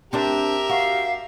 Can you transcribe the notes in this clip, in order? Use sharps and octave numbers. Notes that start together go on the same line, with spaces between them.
C4 D4 G4 A#4 E5
F#4 F5